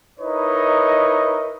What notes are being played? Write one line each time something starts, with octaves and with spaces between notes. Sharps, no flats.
D#4 E4 A#4 B4 C#5 D#5